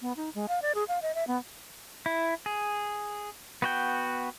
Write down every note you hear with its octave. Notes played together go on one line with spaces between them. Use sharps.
B3
D#4
G#3
F5
D5
G#4
F5
D#5
E5
B3
E4
G#4
B3 F#4 G5